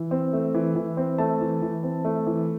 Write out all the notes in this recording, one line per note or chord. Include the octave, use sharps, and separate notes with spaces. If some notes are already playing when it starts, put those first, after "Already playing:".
Already playing: E3
C4
A3
E3
E3
C4
A3 A5
E3
E3
C4
A3
E3